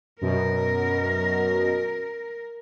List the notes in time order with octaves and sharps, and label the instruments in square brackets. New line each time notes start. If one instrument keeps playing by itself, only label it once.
[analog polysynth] F#2 B2 [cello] A#4